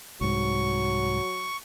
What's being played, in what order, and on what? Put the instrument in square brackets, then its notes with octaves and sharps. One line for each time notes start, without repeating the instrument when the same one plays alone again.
[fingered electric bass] C2 G#2 [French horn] F#3 [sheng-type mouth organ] C#6